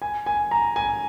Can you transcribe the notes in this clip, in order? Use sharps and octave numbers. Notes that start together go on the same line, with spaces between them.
G#5
G#5
A#5
G#5